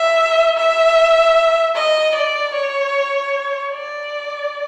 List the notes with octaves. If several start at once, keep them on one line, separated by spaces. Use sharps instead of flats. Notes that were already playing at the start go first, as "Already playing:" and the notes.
Already playing: E5
E5
D#5
D5
C#5
D5